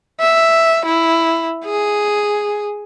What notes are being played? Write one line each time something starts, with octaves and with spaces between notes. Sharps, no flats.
E5
E4
G#4